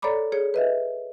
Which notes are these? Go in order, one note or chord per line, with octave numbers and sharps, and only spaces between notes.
A4 C#5 D5 A#5 B5 D6
G#4 C#5
B4 D#5 E5